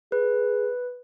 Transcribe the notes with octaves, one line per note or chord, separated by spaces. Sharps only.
G#4 B4